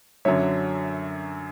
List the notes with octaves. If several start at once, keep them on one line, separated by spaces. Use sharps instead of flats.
F#2 D3 F#3 C#5 E5